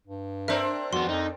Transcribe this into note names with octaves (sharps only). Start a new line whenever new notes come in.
G2
C4 D4 A#4 C5 E5
F2 B3 F#4 C6
F2 D#4